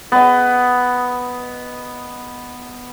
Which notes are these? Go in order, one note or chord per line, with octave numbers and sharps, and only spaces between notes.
B3 D#5